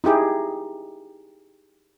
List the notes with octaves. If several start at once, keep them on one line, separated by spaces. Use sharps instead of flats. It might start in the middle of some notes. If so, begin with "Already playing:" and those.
D#4 E4 G4 G#4